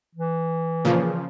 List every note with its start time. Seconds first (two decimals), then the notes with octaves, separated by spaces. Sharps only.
0.15 E3
0.85 A#2 C#3 F3